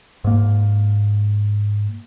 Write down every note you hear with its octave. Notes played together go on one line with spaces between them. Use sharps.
G#2 A#3